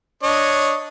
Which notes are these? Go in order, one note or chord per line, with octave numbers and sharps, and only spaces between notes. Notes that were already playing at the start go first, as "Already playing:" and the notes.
D4 C#5 D#5